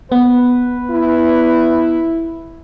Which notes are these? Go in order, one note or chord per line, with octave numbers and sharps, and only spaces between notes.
B3 B4
E4